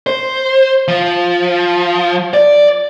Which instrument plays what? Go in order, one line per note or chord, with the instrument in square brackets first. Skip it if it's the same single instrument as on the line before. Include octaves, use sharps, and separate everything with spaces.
[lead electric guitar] C5
F3
D5